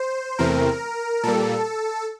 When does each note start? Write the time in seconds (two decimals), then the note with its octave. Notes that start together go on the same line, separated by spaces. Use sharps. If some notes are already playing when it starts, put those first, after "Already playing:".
Already playing: C5
0.39 E2 C3 E3 A3 C4 A#4
1.24 A#2 G3 A#3 A4